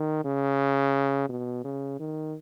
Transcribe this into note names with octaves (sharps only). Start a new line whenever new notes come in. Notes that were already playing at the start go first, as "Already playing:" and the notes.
Already playing: D#3
C#3
B2
C#3
D#3